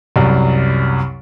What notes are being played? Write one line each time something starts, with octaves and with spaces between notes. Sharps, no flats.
C2 F#2